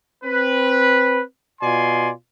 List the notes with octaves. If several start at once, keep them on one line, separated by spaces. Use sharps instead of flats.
C4 B4
B2 F4 D5 G#5 C6